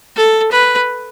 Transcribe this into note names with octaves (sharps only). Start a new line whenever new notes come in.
A4
B4